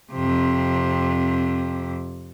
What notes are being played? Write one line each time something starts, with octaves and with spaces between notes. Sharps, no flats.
F2 C3